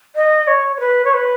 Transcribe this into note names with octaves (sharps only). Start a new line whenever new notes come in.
D#5
C#5
C#5
B4
C#5
B4